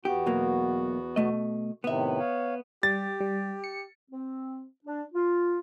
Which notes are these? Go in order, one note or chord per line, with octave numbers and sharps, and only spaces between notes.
E2 B3 F#4 G4
B2 F#3 A#3
B2 A3 D#5
A2 C3 D#3 B3 E5
C#5 F5
G3 G4 A6
G3
C#7
C4
D4
F4